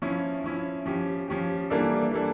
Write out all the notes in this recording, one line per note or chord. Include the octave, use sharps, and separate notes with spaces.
F3 C#4 E4
F3 C#4 E4
F3 C#4 G4
F3 C#4 G4
E3 G3 A#3 D4 A4
E3 G3 A#3 D4 A4